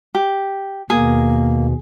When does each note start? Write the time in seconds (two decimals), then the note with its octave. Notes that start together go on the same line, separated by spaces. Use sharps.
0.15 G4
0.90 D#2 B2 A#3 G#4